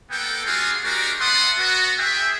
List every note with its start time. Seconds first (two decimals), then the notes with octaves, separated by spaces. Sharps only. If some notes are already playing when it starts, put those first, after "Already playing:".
0.11 A#3 B3 A4 G5
0.45 G3 D4 F4 F#4 G#4
0.84 G#3 D4 F#4 G4 A#4
1.20 B3 E5 F#5 A5 C6 D#6
1.59 B3 F#4
1.98 G#4 E5 G5